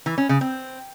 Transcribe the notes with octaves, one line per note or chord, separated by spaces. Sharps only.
E3
C#4
C#3
C4